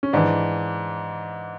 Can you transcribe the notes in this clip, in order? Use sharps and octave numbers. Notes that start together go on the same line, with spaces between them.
C#4
G#2 E3 D4